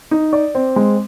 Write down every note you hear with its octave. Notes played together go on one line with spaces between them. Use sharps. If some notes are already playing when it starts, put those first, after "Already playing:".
D#4
D5
C4
G#3